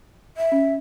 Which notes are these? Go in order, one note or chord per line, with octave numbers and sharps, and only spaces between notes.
E5
C#4